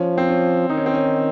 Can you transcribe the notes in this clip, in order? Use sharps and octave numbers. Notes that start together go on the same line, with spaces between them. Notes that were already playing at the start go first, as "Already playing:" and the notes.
Already playing: F3 C#4
C4
C#4
D#3 D#4
C#4
C4
C#4